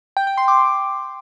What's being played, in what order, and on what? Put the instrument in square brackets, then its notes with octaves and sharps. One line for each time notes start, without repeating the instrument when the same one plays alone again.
[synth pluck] G5
G5
C6
D6